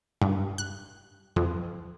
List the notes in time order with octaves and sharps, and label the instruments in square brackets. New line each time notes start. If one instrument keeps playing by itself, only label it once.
[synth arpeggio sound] G2
F#6
F2